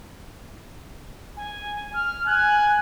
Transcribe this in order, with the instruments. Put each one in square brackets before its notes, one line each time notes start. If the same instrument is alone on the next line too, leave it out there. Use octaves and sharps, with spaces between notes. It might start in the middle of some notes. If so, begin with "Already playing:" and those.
[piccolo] G#5
F6
[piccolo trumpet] G#5 [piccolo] F#6